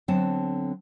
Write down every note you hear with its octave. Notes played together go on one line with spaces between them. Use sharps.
D3 F#3 B3 C4 A5